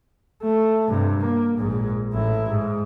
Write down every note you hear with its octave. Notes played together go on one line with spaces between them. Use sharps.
A3
G2 C3
A#3
A#1 G#2
A1 E4
G#2